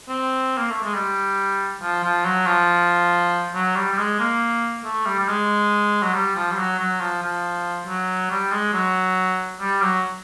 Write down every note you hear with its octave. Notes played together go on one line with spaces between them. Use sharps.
C4
A#3
A3
G#3
G3
F3
F3
F#3
F3
F#3
G3
G3
G#3
A#3
A3
G3
G3
G#3
F#3
G3
F3
G3
F#3
F#3
F3
F3
F#3
G3
G#3
F#3
G3
F#3